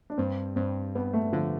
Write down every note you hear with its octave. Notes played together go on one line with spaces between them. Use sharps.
D4
G2 C4
G2 C4
G2 B3
A3
D3 F3